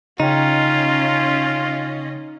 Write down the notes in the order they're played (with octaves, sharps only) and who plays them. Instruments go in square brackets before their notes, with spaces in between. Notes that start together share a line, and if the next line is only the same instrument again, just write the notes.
[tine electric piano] C#3 G5 [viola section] C#4 D#5 [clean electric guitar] D#4 [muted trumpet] F4